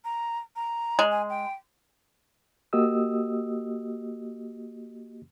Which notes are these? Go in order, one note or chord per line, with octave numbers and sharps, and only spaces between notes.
A#5
A#5
G#3
G#5
G5
A#3 F#4 G4 D#5 D#6 E6